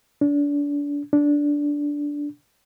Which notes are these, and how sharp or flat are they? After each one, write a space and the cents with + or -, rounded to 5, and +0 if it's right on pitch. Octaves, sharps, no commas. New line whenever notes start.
D4 -30
D4 -10